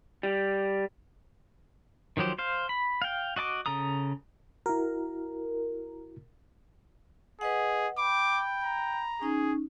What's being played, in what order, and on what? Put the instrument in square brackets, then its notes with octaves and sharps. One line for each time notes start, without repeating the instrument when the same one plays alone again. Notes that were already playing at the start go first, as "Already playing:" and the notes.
[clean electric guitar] G3
[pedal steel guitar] D#3 F3 F#3 G4 C5
C5 F5
B5
F5 G5
F#4 D#5 A5 D6
C#3 A4 A#5 D#6
[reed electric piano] E4 F#4 [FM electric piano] A#4
[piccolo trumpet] G#4 [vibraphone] B4 D#5 F#5
[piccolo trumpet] G5 [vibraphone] B5 [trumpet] D6
[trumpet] A#5
[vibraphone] C#4 D#4 [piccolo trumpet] G#4